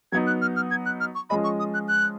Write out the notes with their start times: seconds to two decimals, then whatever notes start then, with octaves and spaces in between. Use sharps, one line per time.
0.12 F#3 B3 D#4 G#6
0.27 F#6
0.42 F6
0.56 F6
0.71 G#6
0.86 F#6
1.00 F6
1.15 C#6
1.30 F3 G#3 C#4 G#4 D#5 B5
1.44 C#6
1.59 D#6
1.74 F#6
1.88 F#6